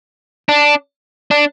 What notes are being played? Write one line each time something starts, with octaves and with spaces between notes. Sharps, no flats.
D4
D4